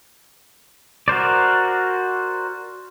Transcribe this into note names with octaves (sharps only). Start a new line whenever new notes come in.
F#4 A#4 C5 D5